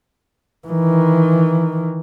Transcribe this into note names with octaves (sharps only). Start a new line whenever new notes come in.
D#3 E3